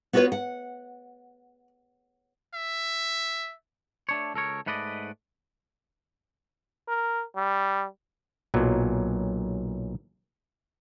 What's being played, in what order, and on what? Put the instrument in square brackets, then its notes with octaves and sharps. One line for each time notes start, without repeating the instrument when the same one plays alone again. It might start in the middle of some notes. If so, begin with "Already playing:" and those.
[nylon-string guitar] B3 F4 F#4 G#4 B4 C#5
F#5
[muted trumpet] E5
[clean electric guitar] A3 D4 C#5
C#2 A4 A#4 C#5
G#2 A3 B4 D5 D#5
[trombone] A#4
G3
[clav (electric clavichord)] B1 A#2 F#3